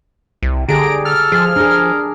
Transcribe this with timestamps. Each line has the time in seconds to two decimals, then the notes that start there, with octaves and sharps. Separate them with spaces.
0.43 C2
0.69 D3 G4 G#4 A#5 D7
1.05 A4 F6
1.32 F3 G#4
1.56 D4 G#4 A#4